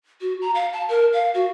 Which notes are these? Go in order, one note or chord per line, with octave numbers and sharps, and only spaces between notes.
F#4
A#5
F5
A5
A#4
F5
F#4